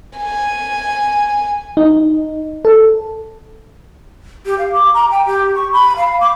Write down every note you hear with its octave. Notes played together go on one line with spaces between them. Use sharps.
G#5
D#4
A4
G4
F5
D6
A#5
G5
G4
C#6
B5
F5
D6